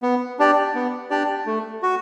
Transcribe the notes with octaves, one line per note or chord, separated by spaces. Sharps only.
B3
D4 G4 D5
B3
D4 G4 D5
A3
F#4